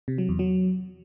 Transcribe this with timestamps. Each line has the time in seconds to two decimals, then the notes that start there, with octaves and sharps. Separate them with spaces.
0.08 C3
0.18 F#3
0.29 E2
0.39 F#3